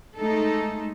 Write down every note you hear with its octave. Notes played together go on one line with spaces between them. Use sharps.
G#3 A3 D#4 A4